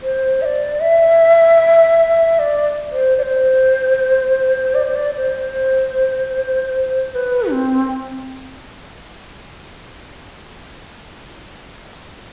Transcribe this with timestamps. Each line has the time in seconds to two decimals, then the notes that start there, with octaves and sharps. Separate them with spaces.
0.03 C5
0.42 E5
0.45 D5
0.81 E5
2.39 D5
2.92 C5
3.18 D5
3.23 C5
4.75 D5
4.84 C5
4.95 D5
5.15 C5
7.11 C5
7.15 B4
7.51 C4